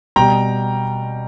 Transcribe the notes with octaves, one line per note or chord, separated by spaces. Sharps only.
B2 G3 G5 A#5